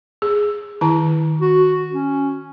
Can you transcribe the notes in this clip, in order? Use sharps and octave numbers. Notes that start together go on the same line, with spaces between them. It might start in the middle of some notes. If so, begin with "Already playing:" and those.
G#4
D#3 E4 A5
F#4
C#4